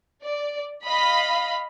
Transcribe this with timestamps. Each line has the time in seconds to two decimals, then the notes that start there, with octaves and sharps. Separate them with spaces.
0.24 D5
0.85 D#5 F5 B5